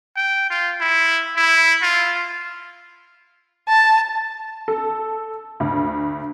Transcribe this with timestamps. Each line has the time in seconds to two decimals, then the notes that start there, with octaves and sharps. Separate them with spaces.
0.16 G5
0.50 F4
0.81 E4
1.36 E4
1.82 F4
3.69 A5
4.68 A4
5.60 D2